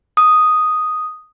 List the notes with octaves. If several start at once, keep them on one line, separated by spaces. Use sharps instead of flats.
D#6